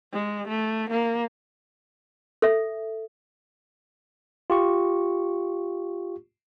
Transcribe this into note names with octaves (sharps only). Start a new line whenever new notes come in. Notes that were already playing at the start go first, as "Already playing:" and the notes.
G#3
A3
A#3
A4 E5
F4 G4 C#6